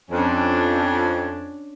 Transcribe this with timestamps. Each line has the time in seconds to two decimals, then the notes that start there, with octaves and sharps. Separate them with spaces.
0.11 F2 C#4 D4